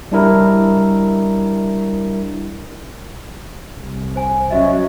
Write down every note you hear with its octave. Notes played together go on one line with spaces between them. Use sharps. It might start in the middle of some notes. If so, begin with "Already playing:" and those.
G3 D4 E4 A#4
C2
C5 G#5
F#3 C#4 F#4 D#5 E5